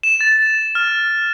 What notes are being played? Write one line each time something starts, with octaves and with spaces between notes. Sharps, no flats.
E7
A6
F6